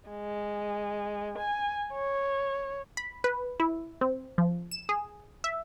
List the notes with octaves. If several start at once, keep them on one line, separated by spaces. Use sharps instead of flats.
G#3
G#5
C#5
B5
B4
E4
C4
F3
E7
G#4
E5